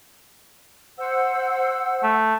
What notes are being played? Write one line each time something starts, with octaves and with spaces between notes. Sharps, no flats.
C5 F#5 E6
A3